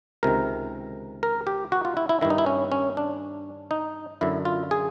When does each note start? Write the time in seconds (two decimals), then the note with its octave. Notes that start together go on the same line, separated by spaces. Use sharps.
0.23 C#2 C3 D#3 A#4
1.23 A#4
1.47 G4
1.72 F#4
1.85 F4
1.97 E4
2.09 E4
2.21 G2 D#3 E4
2.30 D#4
2.38 E4
2.46 C#4
2.72 C#4
2.97 D4
3.71 D#4
4.21 F#2 D3 E4
4.45 F4
4.71 G#4